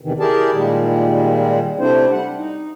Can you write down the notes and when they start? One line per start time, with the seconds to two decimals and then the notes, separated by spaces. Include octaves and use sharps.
0.01 E2 C3 D#3 E3
0.20 E4 G4 G#4 A#4 D5 A5
0.52 A#2 D#3 G3 G#3
1.79 C3 A3 C4 D4 E4 C5
2.12 G3 F#5
2.38 D#4